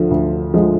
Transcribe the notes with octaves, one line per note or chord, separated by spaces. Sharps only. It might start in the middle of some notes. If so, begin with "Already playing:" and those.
Already playing: D2 D3 F3
D2
D3 F3 G#3